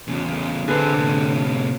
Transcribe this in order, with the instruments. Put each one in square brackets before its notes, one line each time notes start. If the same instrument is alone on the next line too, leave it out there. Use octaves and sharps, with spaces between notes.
[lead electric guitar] E2 C#3
[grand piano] D3 B4 [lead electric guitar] C4 G#4
[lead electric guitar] A2 C3